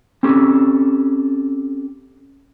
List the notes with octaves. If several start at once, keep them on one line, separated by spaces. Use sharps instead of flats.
C4 C#4 G4 A4